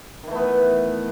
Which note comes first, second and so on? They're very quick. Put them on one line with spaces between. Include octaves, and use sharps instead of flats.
D#3 E3 A3 B3